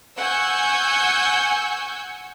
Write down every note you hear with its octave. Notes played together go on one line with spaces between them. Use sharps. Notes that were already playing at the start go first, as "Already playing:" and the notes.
F#5 G#5 C#6 E6 G6 C#7